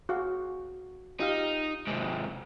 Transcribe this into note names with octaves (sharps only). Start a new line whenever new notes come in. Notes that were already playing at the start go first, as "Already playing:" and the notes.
F#4 G#4 F5
D#4 F4 G4 F5
G#2 C3